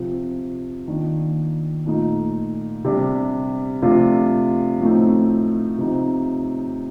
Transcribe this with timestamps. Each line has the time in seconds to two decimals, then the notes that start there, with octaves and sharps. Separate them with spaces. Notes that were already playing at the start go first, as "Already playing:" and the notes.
Already playing: C3 F3 C4
0.87 D#3 A#3 D4 F4
1.86 A#2 A3 D#4
2.85 C3 G3 D4
3.82 C3 F3 A3 D4 F4
4.80 A2 F3 A3 C4 D#4
5.78 C3 F3 C4 D#4